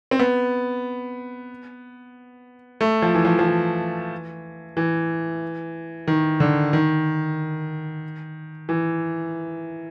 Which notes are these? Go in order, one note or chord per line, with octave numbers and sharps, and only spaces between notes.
C4
B3
A3
F3
E3
F3
F3
E3
E3
D#3
D3
D#3
E3